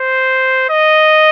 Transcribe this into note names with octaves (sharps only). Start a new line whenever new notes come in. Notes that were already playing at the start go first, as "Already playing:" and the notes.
Already playing: C5
D#5